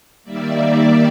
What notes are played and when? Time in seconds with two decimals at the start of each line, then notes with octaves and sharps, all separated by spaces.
0.24 D#3 G3 A#3 D5 E5